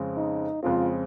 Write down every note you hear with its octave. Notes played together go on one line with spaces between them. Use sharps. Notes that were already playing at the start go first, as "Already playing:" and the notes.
Already playing: F2 C#3 G#3 C4
D#4
F2 C#3 G#3 C4 F4